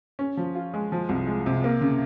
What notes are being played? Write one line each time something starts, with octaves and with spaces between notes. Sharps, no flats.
C#4
F3
F4
G#3
F3
C2
G#3
C3
A#3
C#3